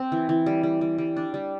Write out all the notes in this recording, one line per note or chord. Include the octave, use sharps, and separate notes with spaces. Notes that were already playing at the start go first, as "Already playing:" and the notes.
Already playing: C4
E3
E3
G3
G3
G3
G3
D4
G3